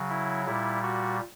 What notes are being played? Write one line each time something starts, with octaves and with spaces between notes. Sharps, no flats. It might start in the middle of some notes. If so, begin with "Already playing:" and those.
Already playing: C#3 F#3
E4
A#2 G3 E4
F#4